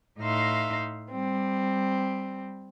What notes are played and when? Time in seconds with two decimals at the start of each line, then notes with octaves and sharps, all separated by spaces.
0.20 A2 D#4 E5 F5 C6
1.11 G3 C4